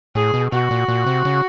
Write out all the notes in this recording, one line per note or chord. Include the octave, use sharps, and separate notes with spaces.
A2 G#4
B2
B2 F#4
A#2
A#2
C3
C#3